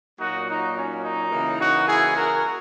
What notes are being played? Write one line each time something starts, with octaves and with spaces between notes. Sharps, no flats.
A#2 F#3 A#3 D#4 F#4
D#4
C#4
D#4
C#3 E3 A#3
D#4 F#4
E4 G#4
F#4 A#4